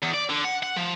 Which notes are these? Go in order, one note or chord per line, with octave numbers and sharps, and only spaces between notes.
E2
D5
D3
F#5
F#5
F3